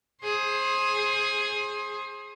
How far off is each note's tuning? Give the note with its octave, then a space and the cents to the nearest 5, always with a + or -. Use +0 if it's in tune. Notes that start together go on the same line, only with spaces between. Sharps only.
G#4 +5 C5 +25